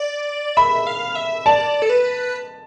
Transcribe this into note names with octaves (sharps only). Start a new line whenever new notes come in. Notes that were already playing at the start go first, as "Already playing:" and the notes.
Already playing: D5
E5 B5
F5
E5
D5 A5
A4
B4